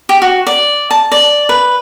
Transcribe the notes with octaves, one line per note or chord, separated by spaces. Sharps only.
G4
F#4
D5
A5
D5
B4